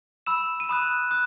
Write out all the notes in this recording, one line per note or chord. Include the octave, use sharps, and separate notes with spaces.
B5 E6 E7
D#7
B5 D#6 F#6 E7
D#6 F#6